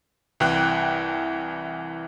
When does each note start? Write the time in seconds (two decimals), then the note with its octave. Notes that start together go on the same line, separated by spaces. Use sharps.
0.40 C2 E3 G5 F#6